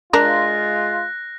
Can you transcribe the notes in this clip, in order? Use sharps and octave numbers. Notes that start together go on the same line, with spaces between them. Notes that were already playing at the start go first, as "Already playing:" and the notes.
G#3 D4 F4 A#4 F#6 A#6